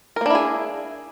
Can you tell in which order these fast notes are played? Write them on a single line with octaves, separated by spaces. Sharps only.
A#4 A#3 D4 E4 G#4